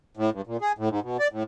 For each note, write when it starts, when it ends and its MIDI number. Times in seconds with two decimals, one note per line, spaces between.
0.17 0.30 45
0.33 0.42 43
0.47 0.57 46
0.61 0.72 68
0.78 0.89 45
0.90 1.00 44
1.03 1.17 47
1.19 1.28 74
1.32 1.43 45